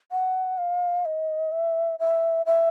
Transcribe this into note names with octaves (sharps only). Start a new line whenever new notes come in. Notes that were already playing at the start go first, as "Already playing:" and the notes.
F#5
F5
D#5
E5
E5
E5